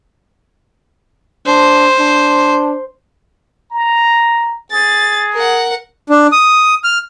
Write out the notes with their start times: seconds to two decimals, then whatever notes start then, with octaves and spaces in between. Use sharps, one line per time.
1.46 D4 C5
2.00 D4
3.71 A#5
4.72 G#4 A6
5.34 A#4 F#5
6.10 D4
6.32 D#6
6.84 F6